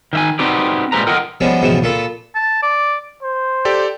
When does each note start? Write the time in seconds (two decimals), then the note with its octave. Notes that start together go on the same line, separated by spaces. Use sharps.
0.13 D#3 E5 G#5
0.39 C4 D#4 F#4 G4 B4 D5
0.92 A#2 G3 G#3 C4 B4 A#5
1.07 F4 A4 A#4 D#5 F#5 G5
1.40 F3 G3 G#3 B3 C#4 D4
1.62 C#2 G#2 B2 E3 F3 G3
1.82 A#2 F4 A4 B5
2.35 A5
2.63 D5
3.23 C5
3.65 G4 A4 D5